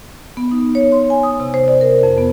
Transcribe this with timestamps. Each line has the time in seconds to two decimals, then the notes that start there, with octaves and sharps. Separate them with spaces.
0.37 B3
0.51 D#4
0.75 C#5
0.92 C6
1.10 G#5
1.23 D#6
1.40 C3
1.54 C5
1.68 D5
1.81 A#4
2.03 F2
2.18 B3